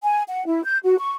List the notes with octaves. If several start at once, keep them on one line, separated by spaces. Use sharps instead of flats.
G#5
F#5
E4
G6
F#4
C#6